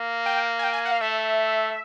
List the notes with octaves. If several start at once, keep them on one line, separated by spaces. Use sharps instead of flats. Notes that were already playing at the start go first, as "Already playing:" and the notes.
Already playing: A#3
G5
G#5
G5
G#5
F#5
F5
A3 E5